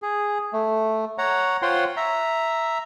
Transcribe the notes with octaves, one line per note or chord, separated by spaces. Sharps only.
G#4
A3
C#5 F#5 A#5
F4 C5 C#5 F#5 G5 C6
E5 A#5